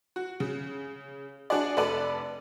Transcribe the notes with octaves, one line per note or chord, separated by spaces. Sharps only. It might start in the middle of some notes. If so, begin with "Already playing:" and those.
F#4
C#3
D4 F#4 G#4 D5
F1 A4 B4 D5 F#7